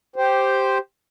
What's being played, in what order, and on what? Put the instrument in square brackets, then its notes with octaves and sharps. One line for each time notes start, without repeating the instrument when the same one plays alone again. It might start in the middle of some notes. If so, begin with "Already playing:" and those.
[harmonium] G4 C5